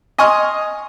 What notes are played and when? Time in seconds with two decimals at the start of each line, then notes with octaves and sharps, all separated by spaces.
0.18 D#5 G#5 C6 C#6 D#6 F6